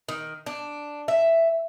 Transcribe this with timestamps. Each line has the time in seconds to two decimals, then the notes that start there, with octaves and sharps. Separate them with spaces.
0.09 D#3
0.46 D4
1.08 E5